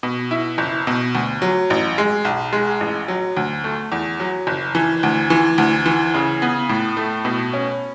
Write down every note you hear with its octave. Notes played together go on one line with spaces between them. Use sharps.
B2
E4
F#1
B2
D2
F#3
A1
G#3
B1
G#3
A1
F#3
D2
A3
E2
F#3
F#1
E3
D2
E3
D2
E3
C#3
B3
A2
A3
B2
C#4